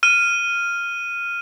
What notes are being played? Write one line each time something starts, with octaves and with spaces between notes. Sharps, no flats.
F6 D#7